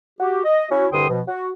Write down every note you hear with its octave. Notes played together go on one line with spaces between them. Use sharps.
F#4 G4
D#5
C#4 E4 F#4
C2 G2 D3 G5 C6 D#6
B2 F3
F#4